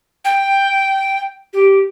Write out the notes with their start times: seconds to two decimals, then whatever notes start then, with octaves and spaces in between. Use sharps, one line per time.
0.25 G5
1.53 G4